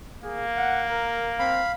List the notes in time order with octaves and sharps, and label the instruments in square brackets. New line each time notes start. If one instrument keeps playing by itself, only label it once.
[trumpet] A#3 [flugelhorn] G#4
[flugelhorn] F#5
A#4
[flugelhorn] C4 [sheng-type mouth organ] F5 B5